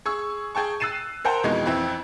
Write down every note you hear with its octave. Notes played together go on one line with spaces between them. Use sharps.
G#4 C#6 E6
G#4 G5 A5 C#6
E6 F#6 A6 C7 D#7 E7
A#4 C5 F#5 G5 A5 A#5
F2 B2 E3 G#3 D#4 G#6
F2 E3 C4 E4